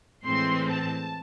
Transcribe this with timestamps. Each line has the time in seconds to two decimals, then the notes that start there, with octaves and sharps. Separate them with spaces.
0.24 A2 E3 G#3 C4 C6
0.69 A5